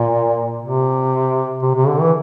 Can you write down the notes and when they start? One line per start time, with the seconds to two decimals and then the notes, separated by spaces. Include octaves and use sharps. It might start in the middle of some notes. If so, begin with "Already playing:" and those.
Already playing: A#2
0.62 C3
1.63 C3
1.75 C3
1.87 D3
2.01 E3